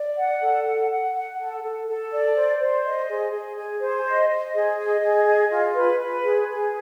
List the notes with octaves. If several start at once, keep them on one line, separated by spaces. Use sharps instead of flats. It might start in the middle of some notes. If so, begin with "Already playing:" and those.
Already playing: D5
F#5
A4
F#5
F#5
F#5
A4
A4
A4
D5
C5
C5
D#5
G#4
G#4
G#4
C5
D#5
D#5
G#4
D#5
G#4
D#5
F4
B4
B4
G#4
G#4